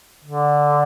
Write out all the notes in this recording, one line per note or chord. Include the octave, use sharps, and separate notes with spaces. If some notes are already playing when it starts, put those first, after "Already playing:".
D3